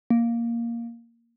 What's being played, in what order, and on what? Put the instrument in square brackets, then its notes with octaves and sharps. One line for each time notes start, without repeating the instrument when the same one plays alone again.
[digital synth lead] A#3